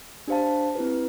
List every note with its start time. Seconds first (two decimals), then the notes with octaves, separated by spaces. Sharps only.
0.28 D4 G4 C5 F5 A5
0.75 C4 E4 G4 B4